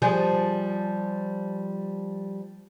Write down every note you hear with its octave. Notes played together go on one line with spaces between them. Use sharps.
F3 G3 G#4